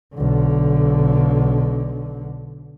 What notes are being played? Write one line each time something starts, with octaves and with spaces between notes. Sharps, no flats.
B1 D3